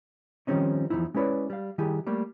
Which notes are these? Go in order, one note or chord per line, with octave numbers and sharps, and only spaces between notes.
D#3 F3 G3 C4 C#4 D#4
E2 D#3 F3 D#4 E4
G#3 C#4 E4 B4 C#5 D5
G3 F5
D#3 G3 E4 G4 G#4
G3 A3 A#3